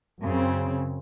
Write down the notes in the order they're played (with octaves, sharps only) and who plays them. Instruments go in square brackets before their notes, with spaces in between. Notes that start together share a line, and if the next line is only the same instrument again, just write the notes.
[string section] F#2 C#3 C4